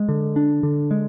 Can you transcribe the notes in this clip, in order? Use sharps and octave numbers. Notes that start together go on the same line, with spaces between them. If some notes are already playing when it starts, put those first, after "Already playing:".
Already playing: G#3
D3
D4
D3
G#3